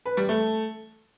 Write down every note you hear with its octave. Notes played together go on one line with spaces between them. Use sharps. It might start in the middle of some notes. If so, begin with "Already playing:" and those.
B4
G3
A3